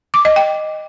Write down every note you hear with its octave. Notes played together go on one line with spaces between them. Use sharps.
D6
D#5
G5